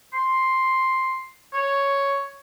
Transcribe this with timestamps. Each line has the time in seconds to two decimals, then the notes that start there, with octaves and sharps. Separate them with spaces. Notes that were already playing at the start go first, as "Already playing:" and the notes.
0.13 C6
1.53 C#5